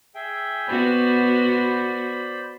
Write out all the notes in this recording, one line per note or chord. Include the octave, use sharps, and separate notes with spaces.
G#4 E5 G5
B3 F#4 C5 D5 B5